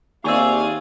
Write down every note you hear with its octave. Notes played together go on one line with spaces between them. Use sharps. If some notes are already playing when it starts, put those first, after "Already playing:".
D#2 C4 F4 G4 G#4 D5 E5 C#6